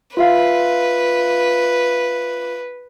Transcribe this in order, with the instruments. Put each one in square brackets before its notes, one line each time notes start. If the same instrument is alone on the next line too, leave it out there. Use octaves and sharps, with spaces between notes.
[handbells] F4 E5 F5 [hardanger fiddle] B4